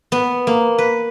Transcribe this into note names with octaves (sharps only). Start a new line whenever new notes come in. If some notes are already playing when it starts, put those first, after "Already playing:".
B3
A#3
B4